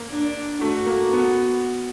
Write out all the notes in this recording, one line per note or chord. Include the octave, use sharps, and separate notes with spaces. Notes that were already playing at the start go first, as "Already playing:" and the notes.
Already playing: A#3
D4
A3 F#4
A#3
B3